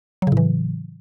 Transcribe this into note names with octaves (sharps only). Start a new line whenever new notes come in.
A2 C#3 E3 F#3